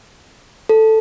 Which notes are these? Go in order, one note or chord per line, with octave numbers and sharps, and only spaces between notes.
A4